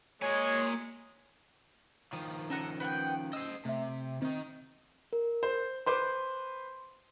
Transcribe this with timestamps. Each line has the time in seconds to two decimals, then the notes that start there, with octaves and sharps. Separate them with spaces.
0.22 G#3 A#3 C#5 G#5
2.13 D#3 F3 D#6
2.50 C#4 A4 A#4 F#5 D#7
2.80 B3 F#5 G5
3.33 C5 D#5 E6
3.65 C3 A3 E5
4.22 D#3 C4 D#4
5.13 A#4
5.43 C5
5.86 B4 C5 C6 D6